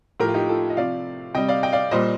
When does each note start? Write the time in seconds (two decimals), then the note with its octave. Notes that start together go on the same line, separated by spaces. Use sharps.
0.20 A2 F3 G4 A#4
0.28 F4
0.34 D#4 G4
0.49 F4 A4
0.70 D#5
0.77 C3 F3 D5 F5
1.35 C3 G3 D#5 G5
1.48 D5 F5
1.63 D#5 G5
1.72 D5 F5
1.91 A#2 G3 C5 D#5